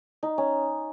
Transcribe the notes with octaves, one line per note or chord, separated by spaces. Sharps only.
D#4
C#4